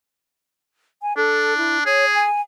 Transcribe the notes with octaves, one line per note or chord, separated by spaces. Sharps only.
G#5
D4 A4
E4
G#4 C#5
G#5